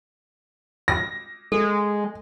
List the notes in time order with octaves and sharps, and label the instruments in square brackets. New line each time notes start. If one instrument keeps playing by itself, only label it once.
[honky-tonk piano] A#6
[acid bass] G#3 [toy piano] A4